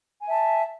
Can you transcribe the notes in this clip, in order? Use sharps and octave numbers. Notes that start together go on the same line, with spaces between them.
E5 G#5 A5